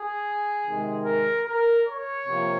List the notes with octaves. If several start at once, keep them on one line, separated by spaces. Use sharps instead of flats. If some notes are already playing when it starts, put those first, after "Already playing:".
Already playing: G#4
C3 D#3 G#3
A#4
A#4
C#5
C3 F3 A#3